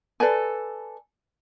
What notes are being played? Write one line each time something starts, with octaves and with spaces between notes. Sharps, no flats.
A4 B4 D5 G#5